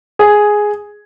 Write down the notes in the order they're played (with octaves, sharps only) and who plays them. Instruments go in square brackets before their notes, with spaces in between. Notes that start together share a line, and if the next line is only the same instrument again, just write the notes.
[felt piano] G#4